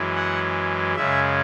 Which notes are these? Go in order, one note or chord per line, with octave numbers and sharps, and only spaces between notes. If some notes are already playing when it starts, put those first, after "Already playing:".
Already playing: F#2 E3 G#3
F#5
F#2 C#3 G#3 E5